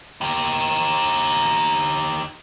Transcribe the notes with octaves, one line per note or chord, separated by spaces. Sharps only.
D#4 G4